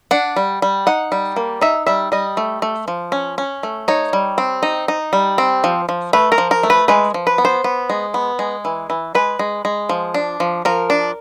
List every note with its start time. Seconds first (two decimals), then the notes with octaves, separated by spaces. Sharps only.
0.11 D4 F#5
0.36 G3
0.62 G3
0.87 D#4 F#5
1.12 G3
1.36 A#3
1.61 D#4 E5
1.87 G3 E5
2.12 G3 D#5
2.37 A3
2.62 A3
2.88 F3
3.12 C#4
3.38 C#4
3.63 A3
3.88 D#4 C#5
4.13 G3
4.38 C4
4.63 D#4
4.88 D#4
5.13 G3
5.38 C4
5.64 F3
5.89 F3
6.13 A3 B4
6.32 A#4
6.38 F3
6.51 A#4
6.63 A3
6.70 B4
6.88 G#3 B4
7.14 F3
7.27 B4
7.38 B3
7.45 C5
7.64 B3
7.90 G#3
8.14 B3
8.39 G#3
8.65 E3
8.90 E3
9.15 G#3 B4
9.39 G#3
9.65 G#3
9.89 F3
10.14 D4
10.40 F3
10.65 F3 A#4
10.90 D4